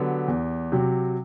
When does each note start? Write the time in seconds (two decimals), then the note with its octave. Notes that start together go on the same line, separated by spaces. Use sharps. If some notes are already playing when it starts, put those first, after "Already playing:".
Already playing: D3 F#3 B3 G4
0.28 E2
0.72 C3 F#3